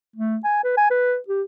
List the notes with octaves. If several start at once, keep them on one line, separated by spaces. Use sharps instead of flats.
A3
G#5
B4
G#5
B4
G4